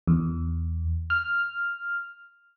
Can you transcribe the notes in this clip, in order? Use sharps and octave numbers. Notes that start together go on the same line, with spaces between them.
E2
F6